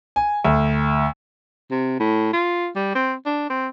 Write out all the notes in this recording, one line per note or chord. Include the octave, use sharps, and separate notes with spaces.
G#5
D2
C3
A2
F4
G3
C4
D4
C4